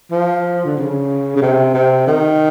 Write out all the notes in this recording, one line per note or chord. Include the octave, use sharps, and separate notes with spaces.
F3
D3
C#3
C#3
C3
C3
D#3